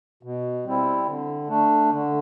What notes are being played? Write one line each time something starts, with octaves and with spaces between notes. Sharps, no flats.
B2
G3 C4 E4
D3
A3 D4
D3